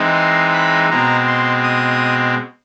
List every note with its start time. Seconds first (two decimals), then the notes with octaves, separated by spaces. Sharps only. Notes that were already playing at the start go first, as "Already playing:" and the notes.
Already playing: E3 G#3 C4 D#4
0.16 C6
0.53 B5
0.90 B2 G#3 C4 A#5
1.27 C6
1.63 D#6